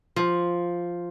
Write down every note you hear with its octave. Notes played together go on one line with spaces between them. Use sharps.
F3